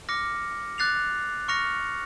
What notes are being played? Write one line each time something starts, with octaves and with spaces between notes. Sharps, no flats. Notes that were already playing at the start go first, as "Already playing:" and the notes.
D6 F6 A#6 C#7
D6 F#6 A6 C7 F7
C#6 F6 A#6 C#7 F7